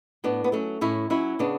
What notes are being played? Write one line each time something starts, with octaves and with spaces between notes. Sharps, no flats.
A2 B3 D4
B3
F#3 A3 C#4
A2 C#4 E4
F#3 C#4 E4
C#3 B3 D4